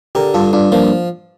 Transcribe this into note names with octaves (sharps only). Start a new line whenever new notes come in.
D3 G4 A#4
G2 F4 A4
G2 D4 F4
F3 A#3 D4